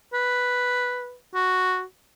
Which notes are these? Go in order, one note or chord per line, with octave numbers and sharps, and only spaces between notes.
B4
F#4